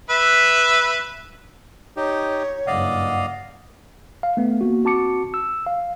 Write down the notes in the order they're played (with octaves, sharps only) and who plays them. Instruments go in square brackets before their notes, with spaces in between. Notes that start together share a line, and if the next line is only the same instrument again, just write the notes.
[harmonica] B4 E5
[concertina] D#4 G4 [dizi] C#5
[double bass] F#1 G2 [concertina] D5 D#5 F5 [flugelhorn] F#5
[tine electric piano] F5
A3 B3
A#3 F#4
C4 F#4 A5 D6 C#7
E6
F5